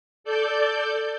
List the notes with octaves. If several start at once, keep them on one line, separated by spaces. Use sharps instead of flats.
A4 D5 G6